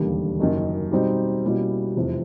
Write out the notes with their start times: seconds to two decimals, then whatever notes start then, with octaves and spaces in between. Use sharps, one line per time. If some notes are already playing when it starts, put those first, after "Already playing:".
Already playing: E1 D#2 D3 G3 A#3
0.40 F#1 F#2 D#3
0.91 B2 G3 C4 D#4 G4
1.43 B2 G3 A#3 C#4 E4
1.96 F1 E2 C3 F3